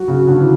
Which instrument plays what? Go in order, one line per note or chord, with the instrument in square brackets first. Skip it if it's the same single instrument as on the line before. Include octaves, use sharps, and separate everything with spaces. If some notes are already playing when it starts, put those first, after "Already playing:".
Already playing: [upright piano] F#3 [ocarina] F#4
[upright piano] C#3
D3
E3